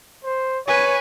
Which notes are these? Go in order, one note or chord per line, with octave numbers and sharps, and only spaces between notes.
C5
B4 C#5 G#5